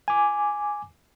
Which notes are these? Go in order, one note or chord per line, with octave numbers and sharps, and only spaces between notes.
G#5 D6